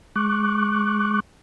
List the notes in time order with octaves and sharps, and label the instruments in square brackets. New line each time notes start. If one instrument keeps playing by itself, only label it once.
[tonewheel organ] G#3 C#6 D6 F#6